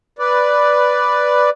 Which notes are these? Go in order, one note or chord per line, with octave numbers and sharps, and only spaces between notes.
B4 D5